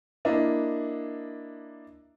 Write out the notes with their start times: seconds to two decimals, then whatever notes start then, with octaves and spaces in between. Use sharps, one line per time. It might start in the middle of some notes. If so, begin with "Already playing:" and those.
0.25 A#3 D4 E4 D#5